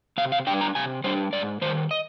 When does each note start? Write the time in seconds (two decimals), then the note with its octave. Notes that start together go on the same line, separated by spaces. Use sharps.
0.18 C3 F5
0.32 F5
0.47 D4 G5
0.51 G3
0.61 A#5
0.75 C3 G#5
1.04 G3 D4 C5
1.33 G#2 D5
1.62 D#3 G3 C5
1.91 D#5